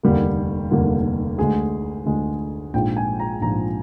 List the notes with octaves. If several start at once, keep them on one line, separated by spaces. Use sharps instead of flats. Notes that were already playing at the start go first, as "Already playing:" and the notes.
F1 D#2 D3 G3 A#3
F1 D#2 D3 G3 A#3
D2 D3 G#3 G#4
D2 D3 G#3
A#1 G#2 F3 G5
G#5
A#5
A#1 G#2 F3 A#5